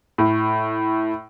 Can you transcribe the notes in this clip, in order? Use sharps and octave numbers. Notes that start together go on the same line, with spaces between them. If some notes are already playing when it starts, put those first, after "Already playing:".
A2